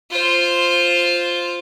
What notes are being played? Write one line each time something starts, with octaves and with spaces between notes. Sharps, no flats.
F4 C5